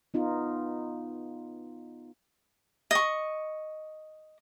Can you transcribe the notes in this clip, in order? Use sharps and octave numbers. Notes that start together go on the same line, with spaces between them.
B3 D#4 F4
D#5 C#6